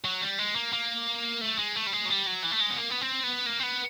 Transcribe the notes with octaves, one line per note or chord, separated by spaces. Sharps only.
F#3
G3
G#3
A#3
A#3
A3
G#3
A3
G3
G#3
F#3
G3
F#3
E3
A3
G#3
B3
A#3
B3
C4
B3
A#3
C4
B3